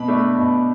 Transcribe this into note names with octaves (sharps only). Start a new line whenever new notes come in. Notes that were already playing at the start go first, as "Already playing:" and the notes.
Already playing: B2 B5
A3 D4
B2